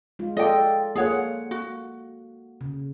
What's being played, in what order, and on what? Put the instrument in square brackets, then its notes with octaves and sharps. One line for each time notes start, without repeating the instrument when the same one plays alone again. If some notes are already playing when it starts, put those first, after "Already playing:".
[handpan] G#3 F4
[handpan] F4 A4 D5 [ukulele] D#5 G5
[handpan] A#3 F4 F#5 [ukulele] G#4 C#5
[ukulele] F#4
[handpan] C#3